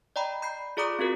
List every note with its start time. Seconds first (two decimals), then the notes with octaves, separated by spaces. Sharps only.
0.16 D5 D#5 G5 A#5 B5
0.42 B5 G6 C7
0.77 F4 G#4 D5 A#5 D6 D#6
0.99 C4 F#4 G#4 A#4